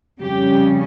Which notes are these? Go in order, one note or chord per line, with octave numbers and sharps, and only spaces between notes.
F2 C#3 G3 C#4 G4